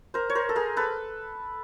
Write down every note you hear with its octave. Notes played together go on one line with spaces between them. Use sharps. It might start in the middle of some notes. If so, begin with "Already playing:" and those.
A#4 C5
C#5
A#4 C5
A4
G#4 A#4
A4 B4